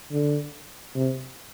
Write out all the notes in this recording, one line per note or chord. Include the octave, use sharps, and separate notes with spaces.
D3
C3